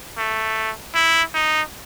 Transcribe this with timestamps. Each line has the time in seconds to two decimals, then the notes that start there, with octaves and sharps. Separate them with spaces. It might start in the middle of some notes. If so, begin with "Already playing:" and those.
0.17 A3
0.95 E4
1.34 D#4